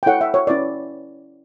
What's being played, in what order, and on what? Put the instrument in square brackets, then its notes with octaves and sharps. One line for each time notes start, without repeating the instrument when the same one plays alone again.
[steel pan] G5
E4 A4 C#5 F#5
E5
C#5
C#4 E4 B4 D5